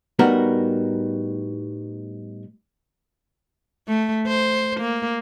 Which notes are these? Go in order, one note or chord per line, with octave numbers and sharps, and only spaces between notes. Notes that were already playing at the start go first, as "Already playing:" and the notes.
A2 G3 B3 D#4 F#4 A#4
A3
C5
A#3